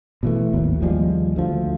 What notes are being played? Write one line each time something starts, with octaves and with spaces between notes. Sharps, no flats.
B2 E3 A3
G#1 D#2 A2 F#3
D#2 F3 G3 G#3
D2 F3